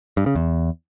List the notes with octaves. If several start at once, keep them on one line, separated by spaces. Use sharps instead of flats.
G2
C#3
E2